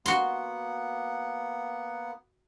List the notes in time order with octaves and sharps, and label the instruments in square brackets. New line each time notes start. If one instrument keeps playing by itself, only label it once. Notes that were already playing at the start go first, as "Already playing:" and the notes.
[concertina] A#3 B3 F#5 [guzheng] F#4 C6